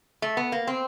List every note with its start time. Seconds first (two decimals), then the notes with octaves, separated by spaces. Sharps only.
0.22 A3
0.37 B3
0.52 A#3
0.67 C4